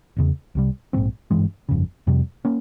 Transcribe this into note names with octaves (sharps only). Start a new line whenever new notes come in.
F1 E2 C#3
C2 C3 G3
A#1 G#2 F3 C4
G#1 G2 E3 G#3
G1 F2 C#3
F2 C3 G3
A#3 C#4